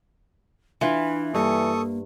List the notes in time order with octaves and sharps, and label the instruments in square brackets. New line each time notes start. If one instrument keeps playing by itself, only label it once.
[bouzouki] E3 [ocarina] D4 [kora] F4 B4
[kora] G2 [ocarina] A#3 [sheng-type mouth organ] A4 C#6 D#6